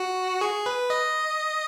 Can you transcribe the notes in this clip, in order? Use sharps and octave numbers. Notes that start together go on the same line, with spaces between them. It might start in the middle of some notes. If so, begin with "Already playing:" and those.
Already playing: F#4
G#4
B4
D#5